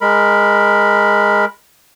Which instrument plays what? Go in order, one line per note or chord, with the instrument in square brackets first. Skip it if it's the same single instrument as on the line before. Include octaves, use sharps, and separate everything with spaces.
[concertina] G#3 A#4 B5